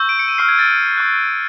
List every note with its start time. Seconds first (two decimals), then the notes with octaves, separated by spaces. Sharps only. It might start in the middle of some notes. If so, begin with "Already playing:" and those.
Already playing: C#6 E6 G6
0.09 D7
0.19 C#7
0.28 D#7
0.38 C#6 F6 C7
0.49 G#6
0.59 A6
0.68 G#6
0.98 C#6 F#6